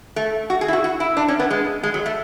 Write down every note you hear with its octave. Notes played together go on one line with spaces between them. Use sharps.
A3
F#4
G#4
E4
F#4
F#4
E4
D4
C#4
B3
G#3
G#3
F#3
A3